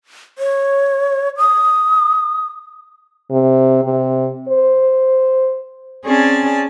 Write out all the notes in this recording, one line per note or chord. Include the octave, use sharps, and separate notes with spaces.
C#5
D#6
C3
C3
C5
C4 C#4 G#4 D5 A5